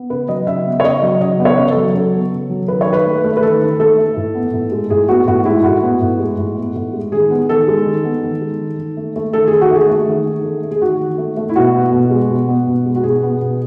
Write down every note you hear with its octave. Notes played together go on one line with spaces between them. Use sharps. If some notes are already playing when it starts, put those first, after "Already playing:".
Already playing: B3
C#3 B4
F#3 D#5
C#3 E5
B3
C#5
C#3 D#5
F#3
C#3 D#5
B3
C#5
C#3
A4
F#3
C#3 A4
B3
C#3
F#3
D#3 B4
C#5
D#3
B4
A3
A3
B4
D#3 A4
D#3
A3 A4
A3
A2
B3
A2
G#3
A2 G#4
B3 F#4
A2 F#4
G#3 E4
A2 F#4
B3
A2
G#3
A2
B3
A2
G#3
D#3 G#4
B3
D#3 A4
G#3
D#3
B3
D#3
G#3
D#3
D#3
A3
A3
D#3 A4
G#4
D#3
F#4
A3 G#4
A3
D#3
D#3
A3
A3
G#4
D#3 F#4
D#3
A3
A3
E4
B2 F#4
B3
B2
G#3
B2
B3
B2
G#3
F#4
B2 G#4
B3
B2